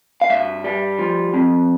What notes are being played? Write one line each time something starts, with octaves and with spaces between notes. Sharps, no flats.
F5
G2 E5
G3
F3
F2